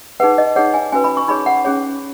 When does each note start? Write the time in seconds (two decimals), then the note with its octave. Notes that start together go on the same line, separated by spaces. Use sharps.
0.20 D#4 G#4 B4 F#5
0.38 D#5
0.56 D#4 G#4 C#5 F#5
0.74 G#5
0.92 C#4 F#4 B4 G#5
1.04 B5
1.17 C#6
1.28 D#4 G#4 C#5 B5
1.46 F#5
1.65 C#4 G#4 C#5